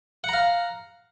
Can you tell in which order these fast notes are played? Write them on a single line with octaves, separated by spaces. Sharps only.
F#5 A#5 F5